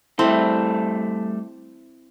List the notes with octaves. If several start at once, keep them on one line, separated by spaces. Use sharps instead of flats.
G3 A3 C4 E4 A4